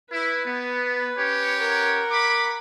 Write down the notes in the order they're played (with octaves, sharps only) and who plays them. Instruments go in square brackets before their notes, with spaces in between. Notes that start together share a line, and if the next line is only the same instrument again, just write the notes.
[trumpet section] E4 [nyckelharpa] B4
[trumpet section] B3
C#4 G4 C#5
[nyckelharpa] A#4 F#5
[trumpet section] B5 D6